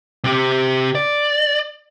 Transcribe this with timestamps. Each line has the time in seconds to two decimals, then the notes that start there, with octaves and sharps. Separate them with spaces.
0.24 C3 G4
0.95 D5